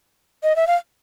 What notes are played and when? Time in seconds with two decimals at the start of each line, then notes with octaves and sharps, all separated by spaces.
0.43 D#5
0.56 E5
0.67 F5